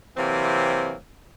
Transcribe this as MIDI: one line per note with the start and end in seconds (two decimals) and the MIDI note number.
0.17 0.95 48
0.17 0.95 52
0.17 0.95 54
0.17 0.95 58
0.17 0.95 60